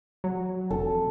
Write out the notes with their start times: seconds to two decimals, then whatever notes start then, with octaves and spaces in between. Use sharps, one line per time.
0.24 F#3
0.71 F1 A4